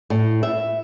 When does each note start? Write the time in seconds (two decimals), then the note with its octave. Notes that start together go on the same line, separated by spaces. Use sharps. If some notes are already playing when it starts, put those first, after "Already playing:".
0.10 A2
0.43 E5